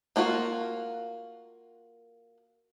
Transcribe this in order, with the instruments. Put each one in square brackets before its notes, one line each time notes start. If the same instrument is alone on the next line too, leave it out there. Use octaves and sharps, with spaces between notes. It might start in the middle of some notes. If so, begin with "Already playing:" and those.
[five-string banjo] A#3 D4 F4 F#4 A#4